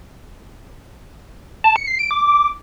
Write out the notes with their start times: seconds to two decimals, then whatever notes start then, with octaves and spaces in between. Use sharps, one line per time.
1.64 A5
1.76 C#7
1.87 C7
1.99 D7
2.11 D6